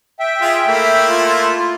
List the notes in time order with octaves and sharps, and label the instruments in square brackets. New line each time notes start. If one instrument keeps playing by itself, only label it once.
[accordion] E5 G5
[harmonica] F4 G#4
A3 A#3 E4
[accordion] F4